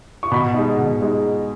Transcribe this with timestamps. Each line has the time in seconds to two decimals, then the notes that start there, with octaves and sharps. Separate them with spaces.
0.23 C#6
0.32 B2 B5
0.54 G#3 D#4
0.78 B2
1.01 G#3 D#4